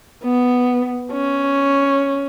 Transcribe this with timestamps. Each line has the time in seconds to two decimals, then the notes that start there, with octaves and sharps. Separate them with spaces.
0.24 B3
1.13 C#4